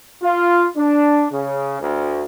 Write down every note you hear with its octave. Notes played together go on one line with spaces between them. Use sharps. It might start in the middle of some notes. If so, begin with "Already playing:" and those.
F4
D4
C#3
D2